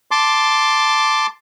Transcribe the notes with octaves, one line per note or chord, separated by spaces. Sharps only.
A5 C6 D6